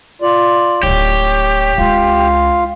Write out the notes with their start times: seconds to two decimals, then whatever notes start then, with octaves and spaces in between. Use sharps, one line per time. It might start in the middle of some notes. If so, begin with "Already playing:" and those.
0.22 F4 D5
0.83 D1 E4 G4 C#5
1.78 C#2 C#4 F4 F5